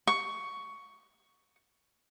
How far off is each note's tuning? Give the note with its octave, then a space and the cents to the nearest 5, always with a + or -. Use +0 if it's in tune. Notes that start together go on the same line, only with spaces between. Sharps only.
C#6 +10